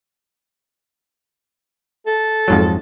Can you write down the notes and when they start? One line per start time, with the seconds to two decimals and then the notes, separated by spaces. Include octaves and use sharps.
2.07 A4
2.48 F2 G#2 F#3